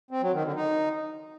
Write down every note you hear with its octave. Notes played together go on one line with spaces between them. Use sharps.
C4
F#3
D#3
D3
D#4